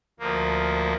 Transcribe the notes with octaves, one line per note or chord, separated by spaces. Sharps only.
D2 F3 A#3